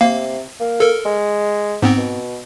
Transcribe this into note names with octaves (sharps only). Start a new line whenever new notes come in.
C3 A#3 F5
A#3
A4 A#4
G#3
G#2 B3 C4
B2